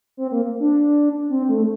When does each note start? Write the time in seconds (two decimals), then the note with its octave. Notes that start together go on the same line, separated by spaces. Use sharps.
0.17 C4
0.32 A#3
0.60 D4
1.30 C4
1.49 A3